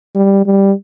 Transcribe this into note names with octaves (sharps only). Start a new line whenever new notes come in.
G3
G3